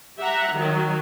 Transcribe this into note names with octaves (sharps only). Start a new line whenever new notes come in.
G4 E5 F#5 A#5
D#3 F#3